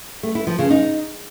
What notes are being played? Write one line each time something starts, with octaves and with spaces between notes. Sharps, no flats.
A3
E4
F3
C#3
D#4